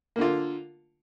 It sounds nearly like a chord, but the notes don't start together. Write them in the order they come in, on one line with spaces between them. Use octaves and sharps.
A#3 D3 F4